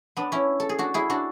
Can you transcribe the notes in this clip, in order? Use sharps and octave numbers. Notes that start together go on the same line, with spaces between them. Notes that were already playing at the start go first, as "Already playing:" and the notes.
B3 D4
C#4 E4
A4
G#4
D4 F#4
E4 G#4
D4 F#4